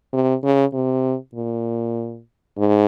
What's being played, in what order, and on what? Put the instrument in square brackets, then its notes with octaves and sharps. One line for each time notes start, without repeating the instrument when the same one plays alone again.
[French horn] C3
C#3
C3
A#2
G#2